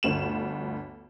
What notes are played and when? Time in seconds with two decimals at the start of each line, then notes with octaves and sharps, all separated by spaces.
0.03 G1 D2 E7